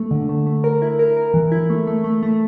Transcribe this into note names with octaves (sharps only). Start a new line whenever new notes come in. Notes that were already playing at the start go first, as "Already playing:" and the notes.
Already playing: A3
D3
A3
A3
A#4
E4
A#4
A#4
E3
E4
A3
A3
A3
A3